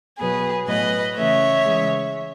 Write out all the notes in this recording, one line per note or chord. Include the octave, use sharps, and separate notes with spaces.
B2 F#3 B3 G#4 B4
A2 F#3 B3 B4 D#5
C#3 E3 A3 C#5 E5
C#3 E3 G#3